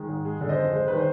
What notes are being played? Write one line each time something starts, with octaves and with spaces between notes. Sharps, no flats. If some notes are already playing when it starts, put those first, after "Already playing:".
Already playing: D#3 G#3
G#2
G#3
D3
C5 D#5
F2
G#3 C5
D#3 B4
C5